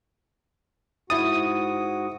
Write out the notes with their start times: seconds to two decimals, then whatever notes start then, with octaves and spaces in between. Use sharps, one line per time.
1.10 G#2 E4 F#4 D#6 A6